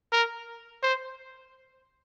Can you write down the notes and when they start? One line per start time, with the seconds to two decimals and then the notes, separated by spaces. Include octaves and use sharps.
0.12 A#4
0.83 C5